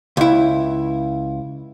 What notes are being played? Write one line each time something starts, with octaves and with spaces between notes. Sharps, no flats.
C#2 E4